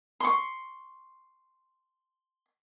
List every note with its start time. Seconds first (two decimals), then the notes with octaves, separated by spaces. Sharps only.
0.20 C6 C#6